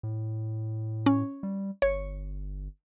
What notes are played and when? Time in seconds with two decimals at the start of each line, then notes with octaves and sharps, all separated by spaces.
0.03 A2
1.06 C#4
1.43 G3
1.82 G1 C#5